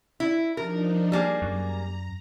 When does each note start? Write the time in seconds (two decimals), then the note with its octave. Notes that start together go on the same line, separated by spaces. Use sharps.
0.20 E4
0.57 F3 D4 D#4 A#4
1.12 G3 A#3 G#4
1.42 F#2 A#5